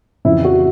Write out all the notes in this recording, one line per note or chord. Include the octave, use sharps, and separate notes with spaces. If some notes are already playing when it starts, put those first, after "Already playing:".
F2 C#3 E3 E4
F#4